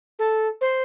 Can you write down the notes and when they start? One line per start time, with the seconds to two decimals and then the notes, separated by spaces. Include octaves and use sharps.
0.19 A4
0.61 C5